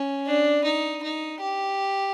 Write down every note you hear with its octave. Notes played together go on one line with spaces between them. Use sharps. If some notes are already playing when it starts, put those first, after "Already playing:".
Already playing: C#4
D4
D#4
D#4
G4